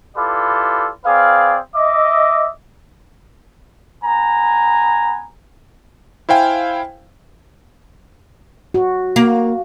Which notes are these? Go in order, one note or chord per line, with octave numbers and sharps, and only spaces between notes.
E4 F4 G4 A4 B4 D5
C4 G#4 B4 D5 F5
D#5 E5 D6
B3 G#5 A#5
E4 C5 F5 G5 G#5
F#4
A#3